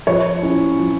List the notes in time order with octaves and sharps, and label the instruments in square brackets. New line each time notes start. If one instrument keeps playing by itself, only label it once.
[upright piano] F3 C#5
C#4 E4
F3